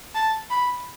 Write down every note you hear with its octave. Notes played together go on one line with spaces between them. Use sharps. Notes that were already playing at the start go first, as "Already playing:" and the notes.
A5
B5